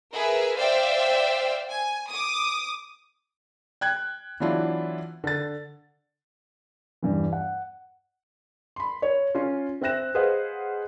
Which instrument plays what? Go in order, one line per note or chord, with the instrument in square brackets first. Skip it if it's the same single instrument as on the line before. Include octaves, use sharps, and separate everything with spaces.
[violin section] G#4 A#4 B4 E5
C5 D5 E5 F5 G5
G#5
D6 D#6
[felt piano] G5 F#6 G#6
E3 F#3 B3 D4 E4 F4
D3 A6
[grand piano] E2 G2 E3
F#5
[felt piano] B5 C6
C#5
C#4 F4
C4 E5 G5 F#6 A#6 E7
G#4 B4 C5 D#5 F5 F#5